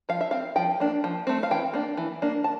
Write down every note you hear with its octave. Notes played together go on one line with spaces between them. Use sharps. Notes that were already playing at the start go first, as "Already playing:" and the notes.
F3 F5
E5
C4 F5
F3 G5
A#3 D4
F3
A3 C4
F5
E3 G5
A#3 D4
E3
A#3 D4
A5